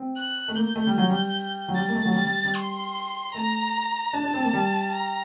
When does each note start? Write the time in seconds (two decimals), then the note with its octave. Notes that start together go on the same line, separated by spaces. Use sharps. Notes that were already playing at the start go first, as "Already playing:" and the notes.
Already playing: C4
0.16 F#6
0.48 A3
0.56 A#3 G6
0.76 A3
0.87 G3
0.98 F#3
1.09 G3
1.68 F#3
1.75 G3 A6
1.89 A#3
1.95 A3
2.05 F#3
2.14 G3 A6
2.25 G3
2.44 G3
2.55 C6
3.34 A3 A#5
4.13 D4 A5
4.24 D4
4.34 C4
4.44 A#3
4.53 G3
4.93 A#5